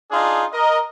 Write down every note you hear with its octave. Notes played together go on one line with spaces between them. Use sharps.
D4 D#4 F4 G#4
A#4 D#5